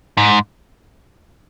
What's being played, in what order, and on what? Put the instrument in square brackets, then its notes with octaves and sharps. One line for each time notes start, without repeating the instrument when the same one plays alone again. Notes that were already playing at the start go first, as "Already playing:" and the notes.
[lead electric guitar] G#2